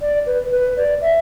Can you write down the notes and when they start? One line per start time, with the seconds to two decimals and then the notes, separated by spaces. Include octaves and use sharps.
0.01 D5
0.26 B4
0.52 B4
0.77 D5
1.01 E5